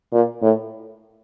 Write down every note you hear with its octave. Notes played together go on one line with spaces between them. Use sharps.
A#2
A2